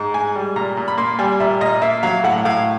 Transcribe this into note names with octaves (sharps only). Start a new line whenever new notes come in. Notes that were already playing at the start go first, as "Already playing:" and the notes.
Already playing: G#2
G#3 G#5
G3
A#2 A#5
A#2
B5
A#3 C6
G3 G#5
A#2 E5
A#2 D#5
A#3 E5
F#3 F5
A2 F#5
A2 F5